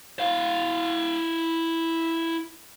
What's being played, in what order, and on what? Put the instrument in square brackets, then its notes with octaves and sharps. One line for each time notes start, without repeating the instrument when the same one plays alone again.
[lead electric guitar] E4 F5